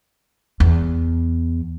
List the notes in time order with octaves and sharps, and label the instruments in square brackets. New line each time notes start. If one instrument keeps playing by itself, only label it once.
[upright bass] E2